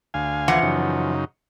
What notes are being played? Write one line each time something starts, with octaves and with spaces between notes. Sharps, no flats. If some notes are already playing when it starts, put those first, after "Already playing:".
D2 F5 G#5
E3 F3 F#5
F#2 C#3 D#4